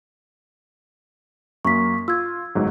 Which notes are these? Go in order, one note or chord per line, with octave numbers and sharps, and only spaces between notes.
F#2 A#3 C#6 B6
F4 E6 G#6
G1 G#2 F#3